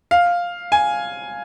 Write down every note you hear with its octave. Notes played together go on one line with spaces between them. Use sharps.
F5
G#5